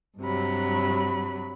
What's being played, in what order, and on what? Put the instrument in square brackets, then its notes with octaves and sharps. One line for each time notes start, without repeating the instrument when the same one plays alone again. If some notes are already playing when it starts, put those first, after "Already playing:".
[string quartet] G2 C3 F#3 B5